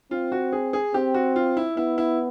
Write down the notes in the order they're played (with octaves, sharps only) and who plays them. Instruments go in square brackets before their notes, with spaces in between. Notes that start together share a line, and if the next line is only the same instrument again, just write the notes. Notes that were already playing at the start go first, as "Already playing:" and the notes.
[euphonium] C4 [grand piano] F4
[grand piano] F#4
G#4
G#4
[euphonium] C4 [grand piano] G4
[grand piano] F#4
F4
E4
[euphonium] B3 [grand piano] E4
[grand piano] E4